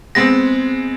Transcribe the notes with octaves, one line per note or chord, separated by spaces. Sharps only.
G#3 B3 C4 A#6